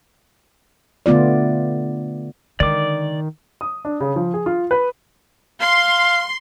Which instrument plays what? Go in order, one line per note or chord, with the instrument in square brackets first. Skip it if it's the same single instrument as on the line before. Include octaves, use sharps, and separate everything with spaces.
[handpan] D3 A3 B3 F4 D5
[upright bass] D3 G#3 [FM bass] D#3 [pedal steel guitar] D5 D6
[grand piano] D#6
D4
C#3
F3
G#4
F4
B4
[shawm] F5 [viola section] C6